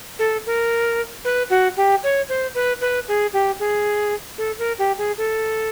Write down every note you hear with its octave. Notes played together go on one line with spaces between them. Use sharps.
A4
A#4
B4
F#4
G4
C#5
C5
B4
B4
G#4
G4
G#4
A4
A#4
G4
G#4
A4